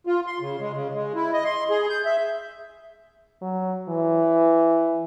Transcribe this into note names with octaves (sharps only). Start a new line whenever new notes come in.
F4
C6
C#3
G#3
C#3
G#3
E4
D#5
C6
G#4
G6
E5
F#3
E3